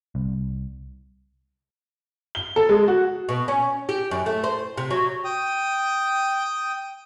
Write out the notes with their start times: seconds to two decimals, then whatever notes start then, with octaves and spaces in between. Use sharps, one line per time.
0.15 C2
2.35 G7
2.56 A4
2.69 G#3
2.88 F#4
3.29 B2
3.48 C#4
3.89 G4
4.11 F#2
4.26 A3
4.44 C5
4.77 C3
4.91 F#3
5.24 G5 D#6